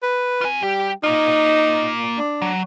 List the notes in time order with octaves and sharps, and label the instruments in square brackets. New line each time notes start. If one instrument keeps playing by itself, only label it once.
[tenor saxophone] B4
[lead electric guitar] F4 G#5
[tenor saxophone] G3 [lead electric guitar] G4
[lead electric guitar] A#3 F4 [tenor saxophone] D#4
[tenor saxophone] D4
[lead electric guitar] F#3